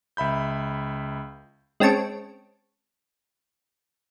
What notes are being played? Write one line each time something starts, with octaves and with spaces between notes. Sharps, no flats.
C#2 E5 B5 G6
G#3 C4 C#4 A5 C#6 D7